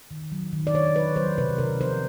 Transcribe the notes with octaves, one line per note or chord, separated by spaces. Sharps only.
D#3
F#3
D#3
D5
D#3 C#5
F#3 B4
F#3 C5
C3 B4
C3 A#4
F3 C5